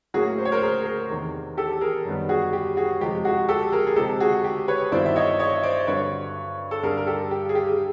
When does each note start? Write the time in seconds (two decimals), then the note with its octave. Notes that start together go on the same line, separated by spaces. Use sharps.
0.14 A2 F#3 A#3 C#4 E4 F#4 G#4
0.38 C5
0.45 C#5
0.52 A#4 C5
0.62 G#4 A#4
0.85 G#4 A#4
1.10 E2 C3 D#3
1.57 G4 A4
1.81 G#4 A#4
2.05 F#2 D#3 G3 B3
2.29 F#4 G#4
2.53 G4
2.77 F#4 G#4
3.00 F2 C3 F3 G#3 G4
3.25 F#4 G#4
3.49 G4 A4
3.72 G#4 A#4
3.87 G#4
3.96 C3 F3 G#3 C4 G4 A4
4.20 F#4 G#4
4.44 G4
4.68 B4 C#5
4.92 G2 D#3 F#3 B3 E4 C5 D5
5.06 E5
5.16 C#5 D#5
5.39 C#5 D#5
5.63 C5 D5
5.87 G2 D3 F#3 B4 C#5
6.71 A4
6.83 G2 D3 G3 G#4 A#4
6.97 A#4
7.07 G4 A4
7.31 G4
7.49 G#4
7.55 G4
7.67 G#4